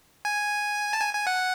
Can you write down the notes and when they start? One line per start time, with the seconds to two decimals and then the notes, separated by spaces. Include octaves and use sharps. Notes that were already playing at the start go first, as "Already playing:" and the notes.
0.25 G#5
0.93 A5
1.01 G#5
1.14 G#5
1.27 F#5